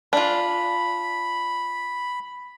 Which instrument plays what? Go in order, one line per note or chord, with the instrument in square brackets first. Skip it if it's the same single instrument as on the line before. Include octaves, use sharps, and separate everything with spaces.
[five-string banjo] D4 F4 [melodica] B5